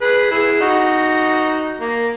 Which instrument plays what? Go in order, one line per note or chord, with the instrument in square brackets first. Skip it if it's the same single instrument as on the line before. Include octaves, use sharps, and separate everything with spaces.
[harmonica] G#4 B4
E4 G#4
D#4 F#4
A#3